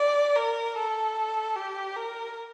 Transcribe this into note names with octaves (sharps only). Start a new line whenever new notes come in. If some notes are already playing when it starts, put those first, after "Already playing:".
Already playing: D5
A#4
A4
G4
A#4